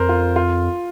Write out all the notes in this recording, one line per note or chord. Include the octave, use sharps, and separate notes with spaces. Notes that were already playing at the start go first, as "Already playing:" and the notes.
Already playing: F2 A#4 C5
F4
F4